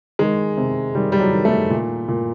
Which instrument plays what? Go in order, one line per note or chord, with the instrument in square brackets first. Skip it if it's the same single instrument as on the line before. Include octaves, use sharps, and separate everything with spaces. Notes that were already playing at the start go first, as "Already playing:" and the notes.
[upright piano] D#3 G#3
C3
D#3 G3
G3
F#3
D#3
A3
A#2
A#2